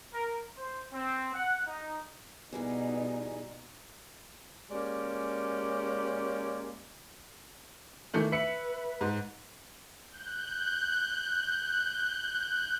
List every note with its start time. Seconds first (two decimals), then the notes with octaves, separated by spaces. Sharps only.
0.14 A#4
0.57 C5
0.93 C4
1.34 F#5
1.67 D#4
2.52 B2 E3 G3 B3 D#4 G#4
4.71 G#3 A#3 C#4 G4 D5
8.14 D#3 E3 A3
8.32 B4 E5 C#7
9.01 G#2
10.07 F#6 G6